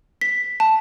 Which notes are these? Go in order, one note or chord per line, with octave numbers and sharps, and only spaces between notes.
B6
A5